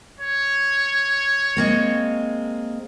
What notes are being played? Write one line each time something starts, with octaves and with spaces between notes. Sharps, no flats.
C#5
G#3 A#3 C4